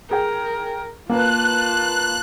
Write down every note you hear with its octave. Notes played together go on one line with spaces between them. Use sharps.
G#4 A#4 G5
A#3 F4 B4 A5 F#6